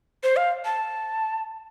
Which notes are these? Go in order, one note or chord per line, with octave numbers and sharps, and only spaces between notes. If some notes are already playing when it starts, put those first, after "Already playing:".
C5
F5
A5